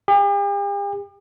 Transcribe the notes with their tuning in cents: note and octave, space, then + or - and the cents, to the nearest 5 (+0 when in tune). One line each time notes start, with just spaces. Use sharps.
G4 +45